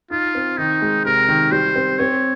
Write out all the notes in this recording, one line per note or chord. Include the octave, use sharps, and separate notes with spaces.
D#4 F4
C4
D#3 D#4
G#3
C3 A#4
D#3
G3 C5
C4
C4 C#5